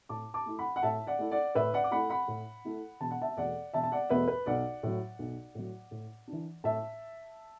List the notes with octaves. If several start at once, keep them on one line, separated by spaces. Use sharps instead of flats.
A2 A5 D6
A5 D6
A3 E4
F#5 B5
F#5
A2 E5 A5
D5 F#5
A3 E4
D5 F#5
A2 B4 E5
D5 F#5
D6
A3 E4 F#5 B5
F#5 B5
A2
A3 E4
E1 A5
F#5
E5 A5
E2 B2 A3 D5 F#5
E1 E5 A5
A5
D5 F#5
E2 B2 A3 B4 E5
B4
B1 D5 F#5
A2 F#3
B1
A2 F#3
A2
E3 D4
A2 E5 A5